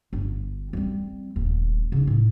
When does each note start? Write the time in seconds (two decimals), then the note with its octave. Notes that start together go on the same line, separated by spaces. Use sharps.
0.13 G1
0.73 G3 C4
1.36 D#1 D2
1.92 C#3 D#4
2.07 A2